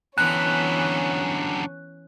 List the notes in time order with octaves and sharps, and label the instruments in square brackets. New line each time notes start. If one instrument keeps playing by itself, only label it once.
[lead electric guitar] F#2 D3 [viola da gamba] E3 B3 [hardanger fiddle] C#4 [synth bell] F#6